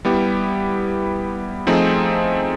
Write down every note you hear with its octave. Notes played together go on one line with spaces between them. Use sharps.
G3 B3 E4 G4
F3 A3 C4 D#4 G#4